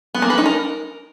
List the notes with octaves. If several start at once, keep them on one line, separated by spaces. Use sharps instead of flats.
B3
A#3
B4
D#4
A#4